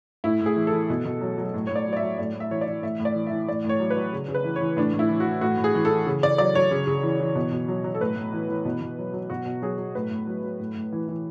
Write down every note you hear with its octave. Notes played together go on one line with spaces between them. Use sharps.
A2 E4
A2
G#4
E3
A4
E3
B2
B2
F#3
F#3
A2
A2 C#5
D5
F#3
D5
E5
F#3
A2 D5
A2
E5
E3 C#5
D5
E3
A2 E5
A2
D5
E3
E5
E3
A2 D5
A2 C#5
F#3
B4
F#3
C#3
C#3
B4
E3
C#5
E3
A2 D4
A2
E4
E3
F#4
E3
A2 F#4
A2
G#4
E3
A4
E3
C#3
C#3 D5
F#3 D5
F#3 C#5
C#3
C#3
E3
E3
B2
B2
F#3
F#3
A4
A2 B4
A2
E3
E3
B2
B2
F#3
F#3
B2 F#4
B2
F#3 G#4
F#3
A2 B4
A2
F#3
F#3
A2
A2
E3
E3